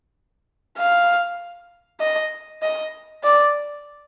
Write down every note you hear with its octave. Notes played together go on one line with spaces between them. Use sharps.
F5
D#5
D#5
D5